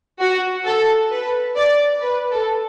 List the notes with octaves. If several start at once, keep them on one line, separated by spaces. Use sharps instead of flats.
F#4
A4
B4
D5
B4
A4